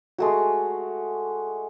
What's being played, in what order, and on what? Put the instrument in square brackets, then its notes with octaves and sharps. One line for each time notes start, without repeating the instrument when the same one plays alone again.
[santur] G#3 A3 F#4